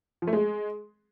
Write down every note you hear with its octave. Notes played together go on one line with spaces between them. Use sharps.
F3
A3
G#3